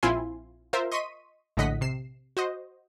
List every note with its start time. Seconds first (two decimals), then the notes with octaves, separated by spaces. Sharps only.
0.03 A#1 C4 E4 F4 G#5 C6
0.73 F4 A#4 C5 E5
0.92 D#5 C6 C#6 B6 D#7
1.57 A#1 A2 D3 D#5 F#5 B6
1.81 C3 C7 E7
2.37 F#4 C5 D#5